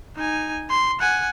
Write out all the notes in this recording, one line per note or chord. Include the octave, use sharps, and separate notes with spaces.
D#4 G#5
C6
F#5 G#5